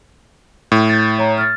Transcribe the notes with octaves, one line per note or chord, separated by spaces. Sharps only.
A2
G6 A6
C#5 A#5
F6 A6